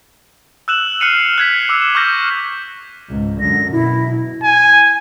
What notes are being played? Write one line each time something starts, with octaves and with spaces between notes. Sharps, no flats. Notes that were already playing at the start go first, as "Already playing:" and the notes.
E6 F#6 E7 F#7
F6 F#6 C7 C#7 D#7 F7
F#6 G#6 B6
D6 E6 F7 F#7
E7
C#6 D6 F6 G6 A#6
C#2 G#2
F#2 D3 A#6
B2 E4
G#5